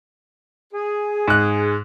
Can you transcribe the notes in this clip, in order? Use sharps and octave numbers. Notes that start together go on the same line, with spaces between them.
G#4
G#2 F#6